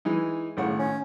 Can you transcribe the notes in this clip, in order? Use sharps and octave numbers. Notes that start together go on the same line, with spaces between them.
E3 G#3 D#4
G#1 A2 C#3 F#5
C#4